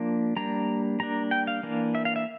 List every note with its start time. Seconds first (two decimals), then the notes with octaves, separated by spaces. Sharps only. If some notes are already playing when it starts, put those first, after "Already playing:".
Already playing: F3 A#3 D4
0.36 G3 A#3 D4 A#5
1.00 G3 A#3 D4 A#5
1.31 G5
1.47 F5
1.63 E3 A#3 D4
1.95 E5
2.05 F5
2.16 E5